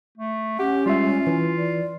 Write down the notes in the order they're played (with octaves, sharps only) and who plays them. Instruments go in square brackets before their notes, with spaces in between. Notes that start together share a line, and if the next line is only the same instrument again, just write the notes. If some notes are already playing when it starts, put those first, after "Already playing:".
[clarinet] A3
[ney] C#4 [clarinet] G4 [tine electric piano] F#5
[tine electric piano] G3 G#3 E5 [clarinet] F4
[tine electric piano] E3
[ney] D5